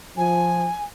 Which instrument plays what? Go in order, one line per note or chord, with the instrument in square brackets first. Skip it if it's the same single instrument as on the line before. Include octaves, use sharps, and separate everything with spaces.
[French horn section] F3 [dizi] G#5